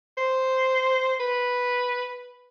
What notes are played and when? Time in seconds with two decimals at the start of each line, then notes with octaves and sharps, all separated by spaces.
0.18 C5
1.20 B4